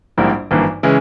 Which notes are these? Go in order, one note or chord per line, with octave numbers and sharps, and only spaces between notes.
A#1 G#2 G3 A#3 E4
G#1 G2 E3 A#3
C#3 E3 G#3